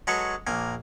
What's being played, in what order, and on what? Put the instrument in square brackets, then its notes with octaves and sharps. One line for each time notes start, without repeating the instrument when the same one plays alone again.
[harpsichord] F#3 G#3 A4 B4 C#5
A#1 A#3 G#5